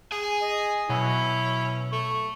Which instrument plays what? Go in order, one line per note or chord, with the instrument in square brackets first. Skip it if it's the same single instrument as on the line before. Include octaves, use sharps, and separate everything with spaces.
[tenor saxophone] G#4 [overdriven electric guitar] G#5
[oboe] D#5
[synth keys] B2 F#3 [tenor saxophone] C#4 [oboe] E4
[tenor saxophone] A3 [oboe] C#6